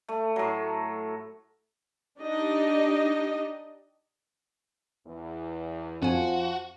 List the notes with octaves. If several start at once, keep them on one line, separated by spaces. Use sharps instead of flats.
A3
A2 F#3
D4 D#4 G4 D#5
E2
F2 F3 F#4 G#5